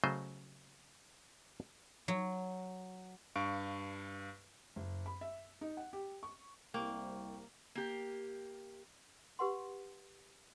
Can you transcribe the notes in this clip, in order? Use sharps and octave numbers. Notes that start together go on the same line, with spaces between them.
C#3 F#3 A3 C5 D#5
F#3
G2 F5 C#6 D7
F#1
B5
E5
D#4
F#5
G4
C#6
C2 A#3 G5 C#6
A#3 G4
G4 B4 F#5 C6